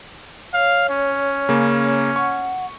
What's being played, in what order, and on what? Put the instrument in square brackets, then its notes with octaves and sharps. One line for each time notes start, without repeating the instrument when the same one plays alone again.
[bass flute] C#5 [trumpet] F5
[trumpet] C#4
[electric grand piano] C#3 A#3
[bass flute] F#5 [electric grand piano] C#6